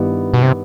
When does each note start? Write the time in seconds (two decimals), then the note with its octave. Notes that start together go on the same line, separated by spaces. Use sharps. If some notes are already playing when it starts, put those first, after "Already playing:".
Already playing: G2 D#3 G3 B3 E4
0.34 B2
0.42 C3